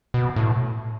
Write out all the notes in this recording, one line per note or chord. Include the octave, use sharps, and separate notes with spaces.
B2
A2